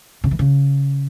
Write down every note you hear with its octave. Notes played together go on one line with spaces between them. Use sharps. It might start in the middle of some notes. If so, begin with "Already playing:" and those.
C#3
E3
C#3